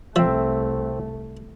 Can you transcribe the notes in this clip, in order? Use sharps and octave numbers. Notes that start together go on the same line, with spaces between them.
C2 F3 A3 C4 E5